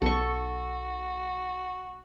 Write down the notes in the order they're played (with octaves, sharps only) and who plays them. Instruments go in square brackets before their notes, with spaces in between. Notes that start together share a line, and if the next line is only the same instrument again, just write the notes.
[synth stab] B1 [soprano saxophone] F#4 [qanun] A4 C#6